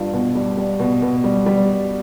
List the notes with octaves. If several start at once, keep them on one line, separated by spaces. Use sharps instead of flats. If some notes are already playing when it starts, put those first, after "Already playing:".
Already playing: G2 F4
B2
G3
G3
B2
B2
G3
G3